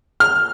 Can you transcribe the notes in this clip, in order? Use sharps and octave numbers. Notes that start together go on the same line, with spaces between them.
F6